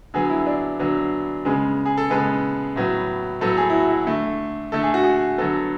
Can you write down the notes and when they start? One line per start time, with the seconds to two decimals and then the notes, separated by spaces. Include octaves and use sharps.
0.14 D3 F#3 B3 G#4
0.30 E4
0.47 D4
0.79 D3 F#3 B3
1.45 C#3 G#3 B3
1.86 G#4
1.98 A4
2.10 C#3 G#3 B3 B4
2.76 A2 F#3 B3
3.41 A2 F#3 B3 A4
3.57 G#4
3.70 E4
3.74 F#4
3.90 E4
4.07 D3 A3
4.72 D3 A3 A4
4.83 G#4
4.94 F#4
5.04 G#4
5.38 D3 F#3 B3 A4